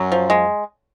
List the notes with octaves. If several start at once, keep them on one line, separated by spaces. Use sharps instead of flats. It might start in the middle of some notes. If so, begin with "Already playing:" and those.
Already playing: F#2 F#3
F3
G#3